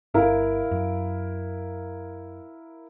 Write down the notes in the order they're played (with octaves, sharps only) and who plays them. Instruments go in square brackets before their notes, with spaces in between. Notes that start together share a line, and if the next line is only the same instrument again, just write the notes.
[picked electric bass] G1 [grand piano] E4 A#4 F5
[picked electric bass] F#2